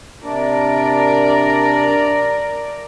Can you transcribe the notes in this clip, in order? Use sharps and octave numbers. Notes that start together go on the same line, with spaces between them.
C3 D4 A#4 D5